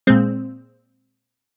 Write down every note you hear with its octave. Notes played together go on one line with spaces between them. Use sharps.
A#2 G#3 C4